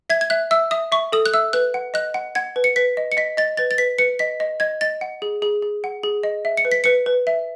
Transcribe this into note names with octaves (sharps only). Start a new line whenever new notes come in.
E5 G#6
G#6
E5 F#6
E5 E6
E5 D#6
E5 C#6
A4 D#6
F#6
E5 E6
B4 F#6
F#5
D#5 F#6
F#5
F#5 G#6
B4
C#7
B4 B6
D#5
C#7
D#5 B6
D#5 A6
B4 A6
A6
B4 B6
B4 C#7
D#5 B6
D#5
D#5 G#6
D#5 A6
F#5
G#4
G#4
G#4
F#5
G#4
D#5
E5
C#7
B4
B6
B4 C#7
B4
E5